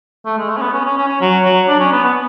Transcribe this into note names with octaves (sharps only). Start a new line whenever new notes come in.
A3
G#3
A3
C#4
B3
C#4
C#4
C#4
C#4
F#3
F#3
D4
C#4
B3
B3